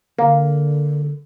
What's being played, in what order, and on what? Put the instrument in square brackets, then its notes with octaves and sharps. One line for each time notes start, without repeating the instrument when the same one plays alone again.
[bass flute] D3 [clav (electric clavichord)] A#3